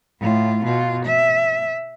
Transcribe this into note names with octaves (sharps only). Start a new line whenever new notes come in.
A2 F4
B2 F4
E5